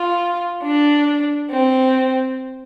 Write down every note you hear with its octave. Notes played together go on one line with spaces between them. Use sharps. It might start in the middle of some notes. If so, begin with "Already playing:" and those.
Already playing: F4
D4
C4